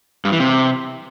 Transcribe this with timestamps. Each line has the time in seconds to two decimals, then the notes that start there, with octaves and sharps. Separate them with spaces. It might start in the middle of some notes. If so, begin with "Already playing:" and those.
0.25 G2
0.32 E3
0.40 C3